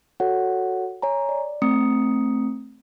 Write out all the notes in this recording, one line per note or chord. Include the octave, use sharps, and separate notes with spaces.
F#4 A4 C#5 F#5
C#5 G#5 A#5
D5
A3 C4 A#5 D#6 C#7